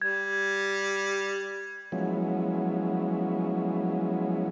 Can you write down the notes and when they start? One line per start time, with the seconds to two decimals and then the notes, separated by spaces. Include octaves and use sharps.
0.02 G3 G#6
1.92 F3 F#3 G#3 B3 C#4 E4